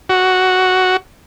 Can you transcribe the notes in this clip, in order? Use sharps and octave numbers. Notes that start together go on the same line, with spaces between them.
F#4